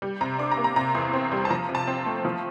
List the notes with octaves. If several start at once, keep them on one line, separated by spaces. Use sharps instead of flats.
G3
C3 A#5
D4 D6
A#5
A#3
A#5
C3 A#5
E2 C6
C4
G3
A5
F3 A#5
C3
A5
C4
A3
F3